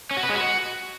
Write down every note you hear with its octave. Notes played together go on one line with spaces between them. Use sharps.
C#4
F#4
B4
G#3
F#4